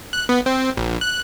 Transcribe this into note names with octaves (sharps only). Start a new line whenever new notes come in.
F#6
B3
C4
A#1
F#6